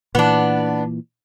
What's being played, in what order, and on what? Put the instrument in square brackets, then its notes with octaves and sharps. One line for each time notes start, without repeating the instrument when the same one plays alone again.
[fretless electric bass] A#2 E3 [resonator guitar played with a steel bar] B3 D4